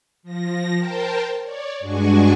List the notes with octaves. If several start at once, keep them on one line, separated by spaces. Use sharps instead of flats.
F3 A#6
A#4 C5 G5 A5
C#5 D5
G2 G#3 D4 F#4 G#5 C#6